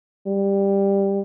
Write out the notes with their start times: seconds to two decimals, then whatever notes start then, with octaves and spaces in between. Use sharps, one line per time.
0.27 G3